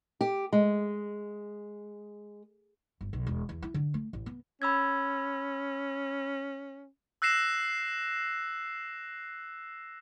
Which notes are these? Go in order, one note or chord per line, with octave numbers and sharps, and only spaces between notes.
G4
G#3
G1
B1
E1
E2
E4
D3
A3
A1
B3
C#4 B5 E6 G#6
E6 F#6 A#6 C7 E7